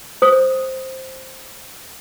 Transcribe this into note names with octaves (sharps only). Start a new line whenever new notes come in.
C5 D#6